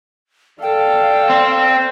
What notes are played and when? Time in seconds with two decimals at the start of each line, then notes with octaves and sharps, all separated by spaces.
0.62 A4 D5 F5 G5
1.30 C4